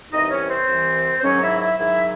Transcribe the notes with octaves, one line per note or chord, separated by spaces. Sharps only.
C2 C3 E3 D#4 D#5
C#4 C#5
C4 C5
C2 C3 E3
C5
G#2 D#3 F#3 C#4 C#5
E4 E5
E4 E5
G#2 D#3 F#3 E4 E5